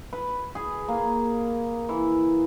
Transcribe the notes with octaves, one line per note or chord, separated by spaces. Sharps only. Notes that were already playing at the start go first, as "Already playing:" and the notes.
B4
G#4
A#3
E3